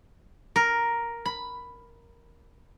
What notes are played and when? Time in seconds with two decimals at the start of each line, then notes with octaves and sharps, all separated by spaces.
0.56 A#4
1.25 B5